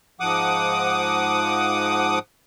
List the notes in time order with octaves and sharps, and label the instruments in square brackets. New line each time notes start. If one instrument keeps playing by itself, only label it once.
[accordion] G#2 F3 F#5 D6 D#6